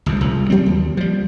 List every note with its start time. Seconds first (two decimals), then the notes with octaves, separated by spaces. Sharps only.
0.06 G1 C#2 F#2
0.21 C2 C#3 F3
0.50 F#3 G3 C4
0.66 D#2
0.97 F3 G3